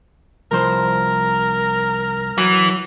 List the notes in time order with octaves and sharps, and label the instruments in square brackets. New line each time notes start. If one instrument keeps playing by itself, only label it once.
[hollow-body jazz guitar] C2 F3 C5 [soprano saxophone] A#4
[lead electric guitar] E3 [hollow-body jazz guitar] F#3